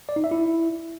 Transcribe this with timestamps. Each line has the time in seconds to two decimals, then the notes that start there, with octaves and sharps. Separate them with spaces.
0.09 D5
0.16 D#4
0.24 E5
0.31 E4